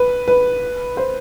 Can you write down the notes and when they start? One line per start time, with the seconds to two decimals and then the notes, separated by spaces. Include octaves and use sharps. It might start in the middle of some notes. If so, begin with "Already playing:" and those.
Already playing: B4
0.28 B4
0.97 C5